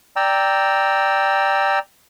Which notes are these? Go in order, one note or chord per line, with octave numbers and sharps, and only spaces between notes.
D5 G5 A#5 E6